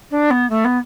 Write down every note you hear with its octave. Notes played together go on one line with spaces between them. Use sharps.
D4
B3
A3
B3